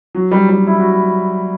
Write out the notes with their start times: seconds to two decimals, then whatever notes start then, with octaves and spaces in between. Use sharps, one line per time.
0.15 F#3
0.31 G3
0.49 G3
0.67 E4
0.80 F#4
0.93 E4